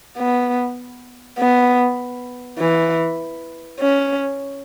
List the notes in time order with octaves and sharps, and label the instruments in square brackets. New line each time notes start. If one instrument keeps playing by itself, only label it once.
[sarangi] B3
B3
E3
C#4